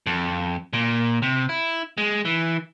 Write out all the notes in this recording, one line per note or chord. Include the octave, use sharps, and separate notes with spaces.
F2
A#2
C3
E4
G#3
E3